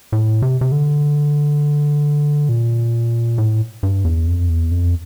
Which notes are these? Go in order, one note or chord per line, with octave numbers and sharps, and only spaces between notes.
A2
C3
C3
D3
A#2
A2
G2
E2
F2
E2
F2